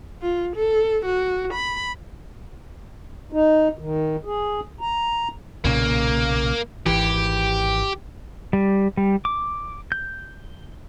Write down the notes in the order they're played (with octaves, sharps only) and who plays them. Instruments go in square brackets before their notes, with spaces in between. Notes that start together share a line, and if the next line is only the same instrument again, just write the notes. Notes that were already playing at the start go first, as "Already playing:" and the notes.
[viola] F4
A4
F#4
B5
[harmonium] D#4
D#3
G#4
A#5
[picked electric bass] B1 A#2 C#3 [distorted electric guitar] A#3
[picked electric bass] G#1 E3 [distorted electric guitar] G4
[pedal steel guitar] G3
G3
D6
G6